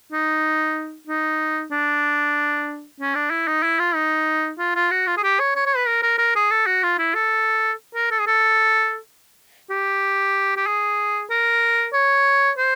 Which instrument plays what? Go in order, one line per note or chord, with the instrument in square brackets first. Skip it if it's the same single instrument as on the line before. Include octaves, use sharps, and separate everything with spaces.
[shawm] D#4
D#4
D4
C#4
D4
E4
D#4
E4
F4
D#4
F4
F4
F#4
F4
G#4
G4
C#5
C#5
C#5
B4
A#4
A#4
A#4
G#4
A4
F#4
F4
E4
A4
A#4
A4
G#4
A4
G4
G4
G#4
A#4
C#5
C5